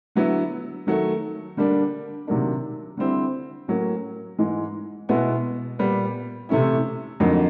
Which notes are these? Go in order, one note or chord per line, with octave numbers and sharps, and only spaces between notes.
D3 F#3 B3 E4
D#3 F#3 A3
D3 G3 A#3 D4
C3 D#3 F#3 A#3 D4
D3 G3 C4 E4
A2 F#3 A#3 C#4
G#2 E3 G#3
B2 G#3 B3 E4
A#2 G3 B3
C3 E3 A3 C#4 E4
F2 D3 F#3 A#3 D#4